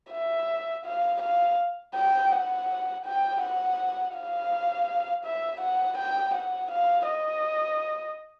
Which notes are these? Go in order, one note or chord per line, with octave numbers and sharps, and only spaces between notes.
E5
F5
F5
G5
F#5
G5
F#5
F5
E5
F#5
G5
F#5
F5
D#5